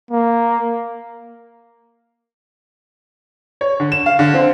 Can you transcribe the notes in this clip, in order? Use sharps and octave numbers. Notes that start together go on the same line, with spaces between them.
A#3
C#5
D3
E7
F5
D3
C4